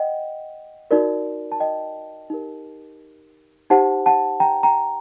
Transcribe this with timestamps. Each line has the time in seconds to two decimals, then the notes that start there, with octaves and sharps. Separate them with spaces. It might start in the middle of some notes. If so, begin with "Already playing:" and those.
Already playing: D#5 F#5 G5
0.91 D#4 F#4 A#4 D5
1.52 A5
1.60 D#5 G5
2.30 D#4 G4 A#4
3.70 D#4 G4 C5 F#5 A5
4.06 F#5 A5
4.40 G5 A#5
4.63 G5 A#5